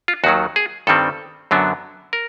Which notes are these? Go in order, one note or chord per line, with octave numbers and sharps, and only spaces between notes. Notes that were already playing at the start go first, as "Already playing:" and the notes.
F4
D#2 D#3 F#3 F#4
G#4
G2 D#3 G3 C4 A4
F#2 D3 F#3 B3 D4
A#4